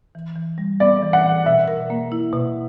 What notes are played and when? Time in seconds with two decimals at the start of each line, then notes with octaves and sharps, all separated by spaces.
0.15 E3
0.36 E3
0.58 G3
0.80 B3 D5
1.03 E3
1.13 F#5
1.25 E3
1.46 B2 E5
1.68 A#4
1.90 A#3
2.12 E4
2.33 B2